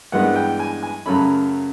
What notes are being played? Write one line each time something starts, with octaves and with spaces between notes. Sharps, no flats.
G2 E3 G#3 B3 F#5
G5
G#5
G#5
F#2 C#3 F#3 A3 C#4 B5